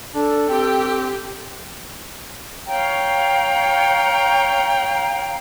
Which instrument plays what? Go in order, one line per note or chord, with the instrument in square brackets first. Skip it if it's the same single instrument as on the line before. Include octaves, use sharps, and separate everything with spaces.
[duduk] D4 [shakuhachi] A4
[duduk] C4 [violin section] G4
[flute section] C#5 F5 G5 A#5